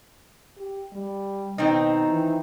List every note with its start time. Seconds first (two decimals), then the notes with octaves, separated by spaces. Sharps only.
0.57 G4
0.93 G3
1.58 B2 D#3 C4 D#4
2.07 E3